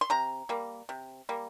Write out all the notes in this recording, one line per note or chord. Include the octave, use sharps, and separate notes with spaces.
C6
C3 A#5
G3 A#3
C3
G3 A#3